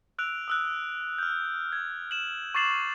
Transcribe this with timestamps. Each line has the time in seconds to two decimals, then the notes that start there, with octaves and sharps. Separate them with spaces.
0.18 E6 F#6 D7 F7
0.48 D#6 E6 F#6
1.18 F6 G6
1.73 G#6
2.11 E7 F#7
2.55 C#6 D6 A6 C7 E7 F#7